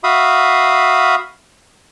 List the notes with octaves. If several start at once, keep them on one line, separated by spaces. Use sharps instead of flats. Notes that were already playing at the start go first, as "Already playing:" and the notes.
F#4 E5 F5 B5 D#6